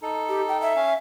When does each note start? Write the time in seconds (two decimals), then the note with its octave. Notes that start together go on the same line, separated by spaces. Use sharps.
0.02 D#4 A4
0.29 G4
0.48 G5
0.61 E5
0.76 C#4 F5